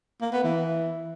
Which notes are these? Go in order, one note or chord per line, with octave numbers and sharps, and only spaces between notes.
A#3
B3
E3